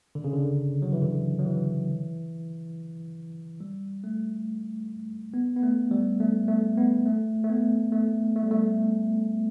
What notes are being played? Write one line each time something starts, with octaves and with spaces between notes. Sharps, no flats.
D3
C#3
D3
F#3
E3
D3
F#3
E3
G3
A3
B3
B3
A3
G3
A3
A3
B3
A3
A3
B3
A3
A3
G3
A3